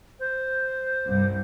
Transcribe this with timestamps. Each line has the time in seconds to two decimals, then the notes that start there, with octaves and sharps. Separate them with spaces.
0.20 C5
1.07 C2 G2